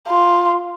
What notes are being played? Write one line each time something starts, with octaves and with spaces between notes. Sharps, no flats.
F4